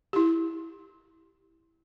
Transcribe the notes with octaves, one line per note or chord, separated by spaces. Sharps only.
E4 G4